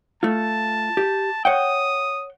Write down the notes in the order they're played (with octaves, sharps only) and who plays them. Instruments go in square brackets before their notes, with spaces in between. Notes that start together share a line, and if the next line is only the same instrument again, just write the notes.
[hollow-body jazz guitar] A3 F4 [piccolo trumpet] A5
[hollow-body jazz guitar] G4
[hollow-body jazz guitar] C#5 F#5 G5 [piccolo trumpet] D#6